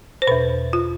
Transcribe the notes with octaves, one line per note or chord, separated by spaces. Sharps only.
C5
E2 B2 B4
F4